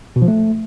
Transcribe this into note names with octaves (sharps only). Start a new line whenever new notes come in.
B2
F3
A3